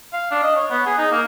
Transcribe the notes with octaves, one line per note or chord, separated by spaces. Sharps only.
F5
D4
D#5
C#5
B3
G#4
D#4
A#3